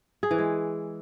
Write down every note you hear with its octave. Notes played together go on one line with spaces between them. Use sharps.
G#4
E3
G#3